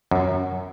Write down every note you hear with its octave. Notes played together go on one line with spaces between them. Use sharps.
F#2